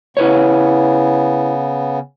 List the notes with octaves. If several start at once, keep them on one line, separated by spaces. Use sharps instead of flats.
C#3 B3 E4 B4 C#5